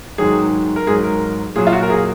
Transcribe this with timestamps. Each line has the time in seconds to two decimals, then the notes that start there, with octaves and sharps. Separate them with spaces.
0.18 G#2 D#3 F#3 G#4
0.76 A#4
0.87 G#2 G#4
0.90 F#3
1.04 A#4
1.56 A#2 F#3 G#4
1.67 F4
1.73 F#4
1.83 A#4
1.90 G#4